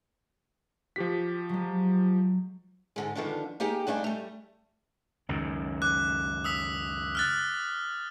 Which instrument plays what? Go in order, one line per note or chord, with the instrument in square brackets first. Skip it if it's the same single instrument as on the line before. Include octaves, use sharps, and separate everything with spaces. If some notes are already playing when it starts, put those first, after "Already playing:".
[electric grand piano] F3 G4 B6 [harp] F#4
[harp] F#3 G#3
[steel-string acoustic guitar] G#2 D3 G#3
D3 D#3 F3 B3 D4
A#3 D#4 G4 G#4 G5
G2 A3 D4 D#4 G#5
G3 A3
[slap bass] C#2 F#2 D#3
[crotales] D6 F#6
D#6 E6 B6
F6 F#6 A6